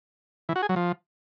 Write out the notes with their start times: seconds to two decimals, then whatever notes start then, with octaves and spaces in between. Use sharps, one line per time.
0.49 E3
0.56 F#4
0.62 G#4
0.69 F#3
0.76 F3